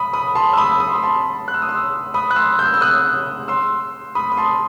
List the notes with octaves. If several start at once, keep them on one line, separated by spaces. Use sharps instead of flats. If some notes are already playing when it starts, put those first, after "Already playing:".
Already playing: B5 D#6
B5 D#6
A5 C6
E6
B5 D#6
D#6
C6
B5
A5 C6
F#6
E6
D#6
C6 E6
B5 D#6
F#6
C6 E6
E6 G6
E6
D#6 F#6
C6 E6
B5 D#6
D#6
A5 C6